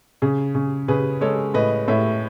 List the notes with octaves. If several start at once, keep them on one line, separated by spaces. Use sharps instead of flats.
C#3 G#4
C#3
C#3 G#4 B4
G#3 A4 C#5
A2 B4 D#5
A2 C#5 E5